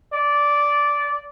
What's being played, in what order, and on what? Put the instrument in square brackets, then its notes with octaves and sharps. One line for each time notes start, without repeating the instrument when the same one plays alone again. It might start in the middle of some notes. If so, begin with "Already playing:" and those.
[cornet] D5